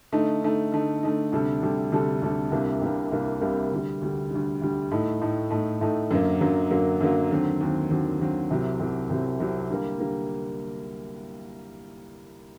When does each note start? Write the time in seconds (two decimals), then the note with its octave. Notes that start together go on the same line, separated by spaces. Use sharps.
0.12 D3 A3 D#4
0.43 D3 A3 D#4
0.72 D3 A3 D#4
1.03 D3 A3 D#4
1.32 D2 C3 G3 D4 A4
1.62 D2 C3 G3 D4 A4
1.92 D2 C3 G3 D4 A4
2.22 D2 C3 G3 D4 A4
2.52 C2 C3 G3 A#3 D4
2.82 C2 C3 G3 A#3 D4
3.12 C2 C3 G3 A#3 D4
3.41 C2 C3 G3 A#3 D4
3.72 D2 D3 G3
4.01 D2 D3 G3
4.31 D2 D3 G3
4.62 D2 D3 G3
4.91 A2 A3 D#4
5.21 A2 A3 D#4
5.51 A2 A3 D#4
5.81 A2 A3 D#4
6.11 F#2 D3 F#3 A#3
6.41 F#2 D3 F#3 A#3
6.71 F#2 D3 F#3 A#3
7.00 F#2 D3 F#3 A#3
7.31 D#2 D3 F#3 C4
7.61 D#2 D3 F#3 C4
7.90 D#2 D3 F#3 C4
8.20 D#2 D3 F#3 C4
8.51 C2 C3 F#3 C4 G4
8.80 C2 C3 F#3 C4 G4
9.10 C2 C3 F#3 C4 G4
9.40 C2 C3 F#3 C4 G4
9.69 D3 G3 A#3
9.99 D3 G3 A#3